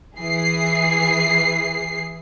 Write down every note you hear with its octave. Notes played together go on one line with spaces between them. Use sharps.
E3 G#4 C7